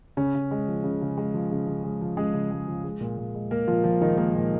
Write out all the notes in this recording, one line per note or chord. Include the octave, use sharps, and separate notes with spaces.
C#3 C#4
C#3
G#3
F3
C#3
C#3
G#3
F3
C#3
C#3
G#3
F3
C#3 G#3 G#4
C#3
G#3
F3
G#3
A#2
A#2
G#3
G#3 A#3 A#4
A#2 F3 F4
A#2 F3 F4
D#3 G#3 D#4
G#3 A#3
A#2